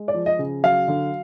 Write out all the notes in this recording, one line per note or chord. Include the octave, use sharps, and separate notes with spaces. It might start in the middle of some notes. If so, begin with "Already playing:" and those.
Already playing: G#3
D5
F3
D#5
C#3
F#3 F5
D3